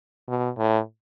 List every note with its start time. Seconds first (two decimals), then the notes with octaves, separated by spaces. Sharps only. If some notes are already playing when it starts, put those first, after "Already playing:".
0.28 B2
0.58 A2